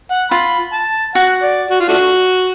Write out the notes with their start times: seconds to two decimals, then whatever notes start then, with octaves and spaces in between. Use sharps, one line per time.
0.11 F#5
0.31 F4 B5
0.73 A5
1.15 F#4 F#5
1.43 D5
1.71 F#4
1.80 F4
1.89 A3 D4 F#4